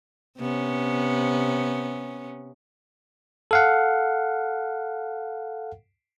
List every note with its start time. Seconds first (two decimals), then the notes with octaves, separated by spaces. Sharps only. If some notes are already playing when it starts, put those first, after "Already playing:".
0.39 C3 B3 C#4
3.51 A4 F5 F#5